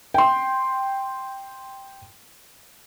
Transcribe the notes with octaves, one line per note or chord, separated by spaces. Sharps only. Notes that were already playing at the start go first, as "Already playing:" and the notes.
G5 C6